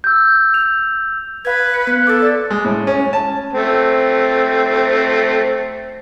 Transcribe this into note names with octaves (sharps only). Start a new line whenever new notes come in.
E6 G6
F7
B4 F5 G#6
C#7
B3 F#6
A4 D6 A6
D5
G#3
A2
C#4
A5
A3 C4